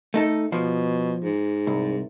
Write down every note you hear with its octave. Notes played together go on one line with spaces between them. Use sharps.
A3 D#4 A4
B2 F3
G#2
C2